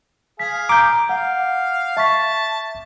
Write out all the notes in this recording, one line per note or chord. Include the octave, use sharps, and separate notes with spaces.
G#4 F5 B6
A#5 D6 G6 D7
F5 F#5
E5 A5 C#6 B6